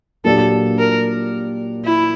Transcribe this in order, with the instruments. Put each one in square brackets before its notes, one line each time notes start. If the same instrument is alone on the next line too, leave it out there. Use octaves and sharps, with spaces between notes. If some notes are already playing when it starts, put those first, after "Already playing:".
[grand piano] A#2 F#3 A#3 D4 G4 [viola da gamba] A4
[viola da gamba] A#4
E4